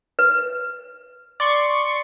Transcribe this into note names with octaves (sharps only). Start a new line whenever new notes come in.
B4
D5 C6 C#6